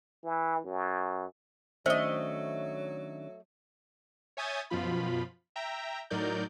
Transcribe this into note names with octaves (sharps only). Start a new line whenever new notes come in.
E3
F#2
D#3 F#3 A3 C#4 D4 C5 D#5 E5
C#5 E5 G#5 D#6 G6 A6
F#2 B2 F3 F4 B5
E5 G5 A#5
A2 F#3 D#4 A#4 D5 G6